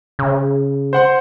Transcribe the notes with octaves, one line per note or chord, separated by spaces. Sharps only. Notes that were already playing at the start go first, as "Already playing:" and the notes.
C#3
C5 F#5 C6